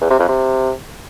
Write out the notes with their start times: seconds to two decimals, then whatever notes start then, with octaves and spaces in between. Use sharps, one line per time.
0.01 E2
0.10 C3
0.19 F2
0.29 C3